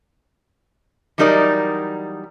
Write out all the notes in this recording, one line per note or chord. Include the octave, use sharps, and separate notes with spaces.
E3 F#3 G3 D#4 A#4 D5